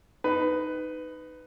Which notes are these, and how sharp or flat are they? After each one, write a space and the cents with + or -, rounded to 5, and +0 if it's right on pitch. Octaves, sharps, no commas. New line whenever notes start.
D#4 +0 B4 +15